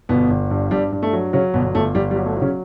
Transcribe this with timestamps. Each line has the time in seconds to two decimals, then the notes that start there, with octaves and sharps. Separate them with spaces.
0.09 G1 B2 B3
0.30 G1
0.51 G2
0.71 G2 G3
0.92 G2
1.03 A3
1.13 F#3
1.33 C#3 F#3 C#4
1.54 G1 B2 B3
1.75 G1 A3
1.95 G1 G3
2.11 G3
2.16 F#3
2.26 A3
2.37 F#3
2.42 C#3 C#4